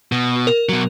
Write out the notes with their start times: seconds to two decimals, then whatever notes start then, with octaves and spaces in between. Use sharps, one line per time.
0.12 B2
0.47 A#4
0.69 B2 F#3